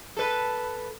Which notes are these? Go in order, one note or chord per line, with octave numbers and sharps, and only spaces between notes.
A4 B4